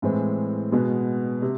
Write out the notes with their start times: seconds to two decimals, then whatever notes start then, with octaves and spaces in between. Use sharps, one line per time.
0.02 A2 E3 G#3 C4
0.72 B2 G#3 B3
1.42 C3